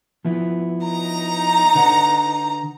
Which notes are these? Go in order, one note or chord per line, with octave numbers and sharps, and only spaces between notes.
F3 B3 E4
D#4 A#5
D3 B4 F#5